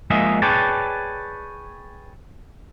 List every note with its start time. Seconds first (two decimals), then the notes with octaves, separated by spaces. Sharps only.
0.10 F3 G#3 A#3 G#4 D#5 E5
0.42 G#4 B4 C#5 D5 G5 A5